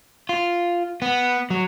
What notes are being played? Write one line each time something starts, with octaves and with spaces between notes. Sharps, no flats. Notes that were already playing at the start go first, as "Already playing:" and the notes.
F4
B3
F#3